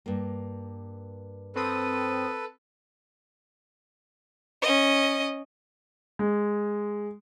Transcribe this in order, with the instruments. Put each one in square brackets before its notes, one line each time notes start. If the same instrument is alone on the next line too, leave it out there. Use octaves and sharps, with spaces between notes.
[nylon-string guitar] G2 A#3
[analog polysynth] C4 D#6 [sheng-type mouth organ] A4 B4
[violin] C#4 D#5
[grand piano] G#3